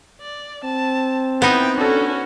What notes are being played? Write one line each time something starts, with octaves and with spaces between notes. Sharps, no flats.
D5
C4 A5
B3 D#4 E4 G5
C#4 D4 F#4 A4